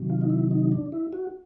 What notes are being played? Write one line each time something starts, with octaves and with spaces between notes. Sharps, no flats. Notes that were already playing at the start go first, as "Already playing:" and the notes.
Already playing: C3 D#3 F#3
F4
D#4
E4
D#4
D4
E4
F#4